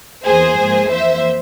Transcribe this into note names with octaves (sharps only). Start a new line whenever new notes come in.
E2 E3 A#3 G#4 C5
G#2 F3 A#3
F2 E3 A#3 C5 E5